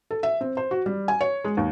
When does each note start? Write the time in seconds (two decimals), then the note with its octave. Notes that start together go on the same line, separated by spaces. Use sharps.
0.11 A4
0.23 E5
0.41 C4
0.57 C5
0.71 F#4
0.86 G3
1.08 G#5
1.21 C#5
1.44 G#3
1.57 D#2